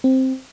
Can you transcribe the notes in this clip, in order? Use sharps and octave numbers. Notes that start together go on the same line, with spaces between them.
C4